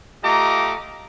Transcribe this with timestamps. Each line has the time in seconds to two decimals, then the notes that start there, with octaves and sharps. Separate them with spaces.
0.24 A3 F4 G4 D#5 A#5 D6